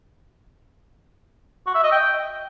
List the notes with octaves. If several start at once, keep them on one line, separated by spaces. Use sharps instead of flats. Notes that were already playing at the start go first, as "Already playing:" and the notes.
F#4
E5
D#5
G5